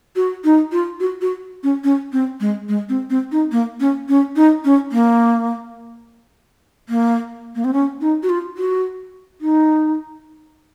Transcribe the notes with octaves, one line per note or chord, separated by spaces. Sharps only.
F#4
D#4
F4
F#4
F#4
C#4
C#4
C4
G#3
G#3
C4
C4
D#4
A#3
C#4
C#4
D#4
C#4
A#3
A#3
A#3
C4
C#4
D#4
F#4
F4
F#4
D#4